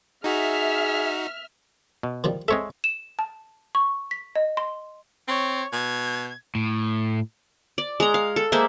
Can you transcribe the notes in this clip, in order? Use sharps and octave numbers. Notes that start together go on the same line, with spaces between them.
D#4 F#4 G#4 E5 F6
B2
D#3 F3 G3
G#3 C4 A4 C#5 E5
E7
A5
C#6
B6
D#5
C6
C4 C#5
B2 G#6
A2
D5
G#3 A#5
F5
A4
G#3 A#3 C5 E5